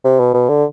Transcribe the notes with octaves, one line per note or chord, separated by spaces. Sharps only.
C3
B2
B2
D3